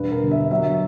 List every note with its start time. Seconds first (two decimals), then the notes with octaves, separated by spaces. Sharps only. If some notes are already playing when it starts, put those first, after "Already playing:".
Already playing: E1 G2 B4
0.12 A#4
0.21 G1
0.31 E5
0.51 F#3 E5